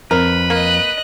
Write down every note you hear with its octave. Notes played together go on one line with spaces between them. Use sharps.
F2 A#4 B4
A#3 D#5 F#6